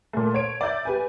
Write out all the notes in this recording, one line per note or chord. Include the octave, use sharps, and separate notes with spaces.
A#2 A3
C#5 D7
D5 E5 G6 A6
G4 B4 G#5